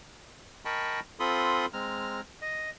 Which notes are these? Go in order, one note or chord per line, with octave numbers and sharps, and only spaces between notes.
A#4 D#5 G5 A5 B5 C#6
C4 F4 A4 B5 C6 D#6
G#3 C4 A#5 F6
D#5